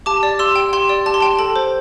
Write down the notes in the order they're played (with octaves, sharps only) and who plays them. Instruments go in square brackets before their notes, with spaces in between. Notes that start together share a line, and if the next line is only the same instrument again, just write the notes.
[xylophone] G4 A5 D6
D5
G4 C6 E6
G5
G4 G5 C6
D5
G4 A5
C6
G5 A5
A4 A5
C5